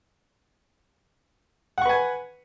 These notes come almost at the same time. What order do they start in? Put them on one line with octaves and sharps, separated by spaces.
F#5 C#6 B4 G#5